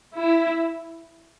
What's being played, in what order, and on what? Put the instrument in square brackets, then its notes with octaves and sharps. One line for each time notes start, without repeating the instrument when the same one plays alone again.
[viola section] E4